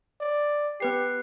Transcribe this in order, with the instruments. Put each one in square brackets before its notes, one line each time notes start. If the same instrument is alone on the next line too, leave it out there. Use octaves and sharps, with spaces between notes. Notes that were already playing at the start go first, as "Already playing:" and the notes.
[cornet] D5
[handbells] B3 B4 C7 [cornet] G4